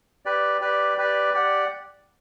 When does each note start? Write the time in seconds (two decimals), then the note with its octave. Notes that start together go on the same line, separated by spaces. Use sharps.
0.25 G4 B4 D5
0.61 G4 B4 D5
0.98 G4 B4 D5
1.34 G4 D5 F#5